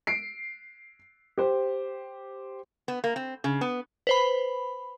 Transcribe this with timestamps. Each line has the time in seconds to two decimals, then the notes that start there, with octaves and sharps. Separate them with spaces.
0.07 C7 D7
1.38 G4 C5
2.88 B3
3.04 A#3
3.16 C4
3.44 C#3
3.61 B3
4.07 B4 C5 B5